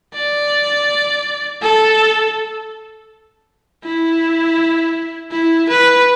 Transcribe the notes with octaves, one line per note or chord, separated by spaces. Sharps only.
D5
A4
E4
E4
B4